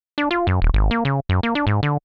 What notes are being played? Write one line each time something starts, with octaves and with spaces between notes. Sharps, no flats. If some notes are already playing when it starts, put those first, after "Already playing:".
D4
F4
F#2
D#1
G#1
A#3
C#3
F#2
A#3
D4
G#2
D3